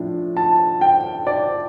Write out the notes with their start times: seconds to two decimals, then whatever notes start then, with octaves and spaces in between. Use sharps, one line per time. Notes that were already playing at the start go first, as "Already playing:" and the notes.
Already playing: A2 F3 D4
0.37 A5
0.81 G5
1.27 D5